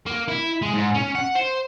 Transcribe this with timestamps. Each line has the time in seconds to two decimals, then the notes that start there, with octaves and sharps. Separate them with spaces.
0.06 A#3
0.28 E4
0.62 G#3
0.74 G#2
0.94 C#4
1.15 F#5
1.35 C5